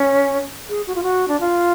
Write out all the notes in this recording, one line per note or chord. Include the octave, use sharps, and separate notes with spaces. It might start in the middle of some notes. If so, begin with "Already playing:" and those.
Already playing: C#4
G#4
F#4
F4
F#4
D4
F4